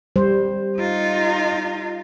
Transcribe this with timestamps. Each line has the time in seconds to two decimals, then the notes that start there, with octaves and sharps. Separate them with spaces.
0.16 G3 C5
0.79 D#4 F4